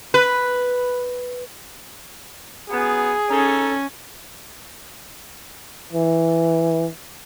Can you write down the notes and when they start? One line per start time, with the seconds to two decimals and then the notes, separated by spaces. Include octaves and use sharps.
0.14 B4
2.70 F#2 B3 G#4
3.30 C#4 D#4 A4
5.92 E3